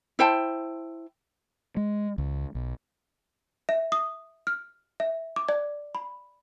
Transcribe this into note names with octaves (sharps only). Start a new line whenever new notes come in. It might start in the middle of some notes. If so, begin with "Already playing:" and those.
E4 C5 G5 A5
G#3
C#2
B1
E5
D#6
F6
E5
D6
D5
B5